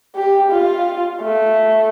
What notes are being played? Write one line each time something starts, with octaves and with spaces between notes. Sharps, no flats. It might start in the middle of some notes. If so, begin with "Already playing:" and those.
G4
F4
A3